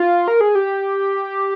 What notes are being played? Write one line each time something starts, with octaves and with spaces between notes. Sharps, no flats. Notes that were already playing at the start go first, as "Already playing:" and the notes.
Already playing: F4
A#4
G#4
G4